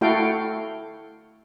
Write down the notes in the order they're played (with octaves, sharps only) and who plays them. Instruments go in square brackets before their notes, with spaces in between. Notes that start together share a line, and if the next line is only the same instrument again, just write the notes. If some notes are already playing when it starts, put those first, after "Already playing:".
[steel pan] A3 E4 F#4 A4 F5 G5